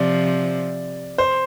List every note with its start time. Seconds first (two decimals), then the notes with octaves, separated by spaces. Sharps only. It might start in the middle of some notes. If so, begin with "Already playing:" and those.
Already playing: C3 F3 D5
1.18 C5